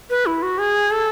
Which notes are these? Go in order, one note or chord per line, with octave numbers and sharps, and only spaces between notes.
B4
E4
F#4
G#4
A4